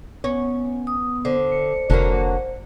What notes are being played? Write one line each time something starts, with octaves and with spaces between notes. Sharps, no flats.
B3 C#4
D#6
D3 C5
C#7
F1 D3 F#3 A#3